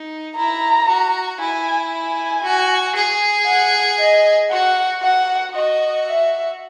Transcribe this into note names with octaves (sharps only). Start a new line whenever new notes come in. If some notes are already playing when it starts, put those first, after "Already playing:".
Already playing: D#4
E4 A#5
F#4
E4 G#5
G#5
F#4
G#4
F#5
D#5
F#4 F#5
F#4 F#5
F#4 D#5
E5